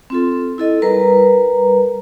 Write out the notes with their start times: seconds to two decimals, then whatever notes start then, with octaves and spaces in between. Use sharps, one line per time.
0.10 C4 F4 A4
0.58 E4 A4 D#5
0.82 G3 A#4 B4 A#5